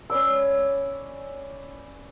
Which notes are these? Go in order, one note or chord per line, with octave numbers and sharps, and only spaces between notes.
C#4 B4 D5 E6